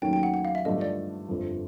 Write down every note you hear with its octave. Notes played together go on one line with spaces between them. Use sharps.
D#2 D#3 F#3 A3 C#4 G5
G5
F#5
F#5
F5
E5
G2 D3 F3 A3 D4 D#5
D5
G1 F2 D3 F3